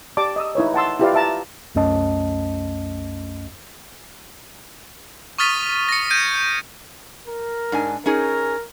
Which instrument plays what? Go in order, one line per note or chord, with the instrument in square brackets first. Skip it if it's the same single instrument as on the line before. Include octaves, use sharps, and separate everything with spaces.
[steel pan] G4 D5 A5 D6
D#5 D#6 E6
D#4 E4 B4 C#5
F#5 A5 C6 E6
E4 F4 G4 B4 D5 F5
E5 A5 A#5
[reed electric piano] C2 F#2 A3 C#4 D#5 A5
[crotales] C#6 D#6 F6 A6 B6 D#7
A#6 C#7
G6 G#6 D7 D#7
[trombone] A#4
[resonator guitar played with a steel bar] G#2 D4 G#5
[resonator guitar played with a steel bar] C#4 D#4 G#4 [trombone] A#4